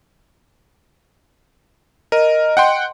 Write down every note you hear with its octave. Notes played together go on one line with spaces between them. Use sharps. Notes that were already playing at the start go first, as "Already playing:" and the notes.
A#4 D#5
F#5 G5 C6